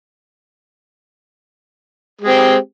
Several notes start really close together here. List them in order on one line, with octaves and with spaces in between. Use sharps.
G#3 G4 C4